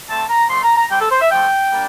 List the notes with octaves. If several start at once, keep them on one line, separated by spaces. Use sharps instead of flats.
D3 A3 C4 A5
A#5
D3 F3 A3 C6
A#5
A#5
C3 G3 C4 G5
A4
C5
E5
D3 F3 A3 G5
G3 A#3 D4